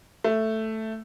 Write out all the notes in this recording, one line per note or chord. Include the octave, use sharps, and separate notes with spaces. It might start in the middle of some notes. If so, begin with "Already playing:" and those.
A3